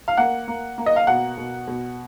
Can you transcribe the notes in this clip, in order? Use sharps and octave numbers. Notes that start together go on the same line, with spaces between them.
F5
A#3 F#5
A#3
A#3
D#5
F5
B2 F#5
B2
B2